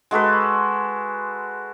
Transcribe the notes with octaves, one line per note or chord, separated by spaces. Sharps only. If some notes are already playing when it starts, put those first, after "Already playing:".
G#3 F#4 A4 B4